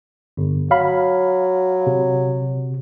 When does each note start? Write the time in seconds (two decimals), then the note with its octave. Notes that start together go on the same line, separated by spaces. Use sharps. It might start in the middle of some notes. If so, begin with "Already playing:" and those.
0.37 G1
0.71 F#3 F5 B5
1.87 C3